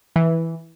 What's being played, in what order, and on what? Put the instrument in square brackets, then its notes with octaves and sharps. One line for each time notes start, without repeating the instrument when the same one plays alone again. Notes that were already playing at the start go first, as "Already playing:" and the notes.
[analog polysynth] E3